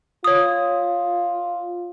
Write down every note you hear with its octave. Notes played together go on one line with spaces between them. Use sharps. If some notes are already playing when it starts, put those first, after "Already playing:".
F4 C#5 D#6